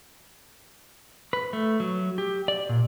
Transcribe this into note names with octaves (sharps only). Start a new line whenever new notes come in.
B4
A3
F#3
G4
D5
A#2